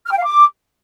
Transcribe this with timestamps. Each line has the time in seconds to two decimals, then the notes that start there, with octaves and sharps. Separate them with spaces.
0.05 F6
0.12 G5
0.18 F5
0.24 D6